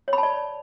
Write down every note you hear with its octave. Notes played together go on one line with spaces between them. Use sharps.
C#5
B5
A5
D5